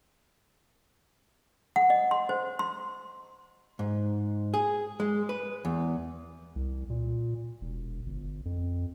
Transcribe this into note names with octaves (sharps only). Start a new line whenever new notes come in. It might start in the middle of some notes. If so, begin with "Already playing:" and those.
F#5
D#5
C6
C5
C6
G#2
G#4
G#3
B4
E2
C2
A#2
E1
G1
F2